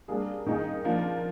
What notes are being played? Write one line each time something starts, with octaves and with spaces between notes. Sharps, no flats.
G3 A#3 D4 G#4
D#3 A#3 D#4 G#4
F3 A#3 D4